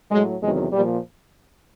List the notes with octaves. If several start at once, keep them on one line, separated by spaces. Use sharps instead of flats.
A2 F#3 G#3
E2 C3 D#3 F#3 G#3
A#2 F3 G3